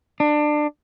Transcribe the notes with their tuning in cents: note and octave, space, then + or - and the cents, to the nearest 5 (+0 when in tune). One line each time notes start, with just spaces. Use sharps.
D4 +25